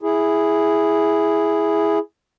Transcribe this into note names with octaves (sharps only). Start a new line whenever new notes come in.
E4 G#4